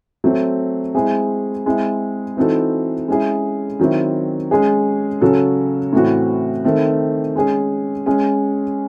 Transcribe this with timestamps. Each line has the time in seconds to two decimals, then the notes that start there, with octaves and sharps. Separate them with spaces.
0.24 F#3 A3 C4
0.95 G#3 C4 E4 G#4
1.66 G#3 C4 E4
2.37 E3 C4 D#4 F#4 A4
3.08 G#3 C#4 E4 G#4
3.80 D#3 F#3 C4 E4
4.51 G#3 C#4 G#4
5.21 C#3 F#3 C#4 F#4 A4
5.93 A2 E3 C4 F#4
6.64 D#3 A3 C4
7.36 G#3 C#4 G#4
8.06 G#3 C#4 G#4